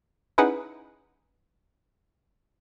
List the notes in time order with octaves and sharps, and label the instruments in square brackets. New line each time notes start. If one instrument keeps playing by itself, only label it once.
[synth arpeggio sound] C#4 D#4 E4 G#4 B4 F#5